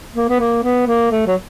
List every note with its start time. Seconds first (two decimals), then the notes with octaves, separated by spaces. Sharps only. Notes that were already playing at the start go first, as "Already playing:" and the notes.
0.16 A#3
0.29 B3
0.40 A#3
0.64 B3
0.87 A#3
1.11 A3
1.27 F#3